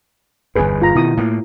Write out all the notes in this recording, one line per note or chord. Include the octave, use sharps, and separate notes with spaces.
G1 E2 G#2 G#4 B4
F4 A#5
B2 D#3 E4 D#6
A2 A3 A#3